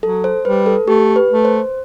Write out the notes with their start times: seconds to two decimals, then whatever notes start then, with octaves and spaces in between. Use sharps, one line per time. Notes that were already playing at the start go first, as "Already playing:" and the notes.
0.03 F#3 A4
0.24 C5
0.45 G3 B4
0.66 A4
0.88 A3 G4
1.16 B4
1.30 A3
1.45 C5